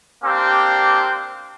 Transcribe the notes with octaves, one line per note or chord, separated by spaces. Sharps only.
A#3 C4 D4 G4